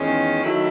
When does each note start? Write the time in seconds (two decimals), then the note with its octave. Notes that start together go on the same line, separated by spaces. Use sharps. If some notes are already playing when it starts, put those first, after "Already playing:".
Already playing: E2 D#3 G#3 C#4
0.42 D#3 F#3 A3 E4